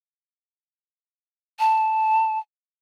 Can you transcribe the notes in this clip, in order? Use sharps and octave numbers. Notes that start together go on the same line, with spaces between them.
A5